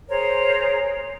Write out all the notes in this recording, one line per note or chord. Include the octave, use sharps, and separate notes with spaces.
G#4 A#4 C5 C#5